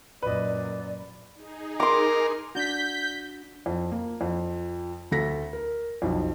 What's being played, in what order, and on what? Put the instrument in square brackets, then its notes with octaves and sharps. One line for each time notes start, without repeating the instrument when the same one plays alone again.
[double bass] F#2 A#2 [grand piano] B4 D#5 [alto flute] D5
[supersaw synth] D#4 G#4
[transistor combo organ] A#4 [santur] C6 D6
[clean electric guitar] D4 F#4 [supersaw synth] G6 B6
[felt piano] F2
A#3
F2
D2 A4 A#6 B6
A#4
B1 F2